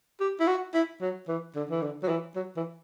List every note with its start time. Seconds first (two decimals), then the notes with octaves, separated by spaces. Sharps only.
0.20 G4
0.40 E4
0.48 F#4
0.74 E4
1.01 F#3
1.28 E3
1.55 D3
1.71 E3
1.82 D3
2.03 F#3
2.08 E3
2.36 F#3
2.57 E3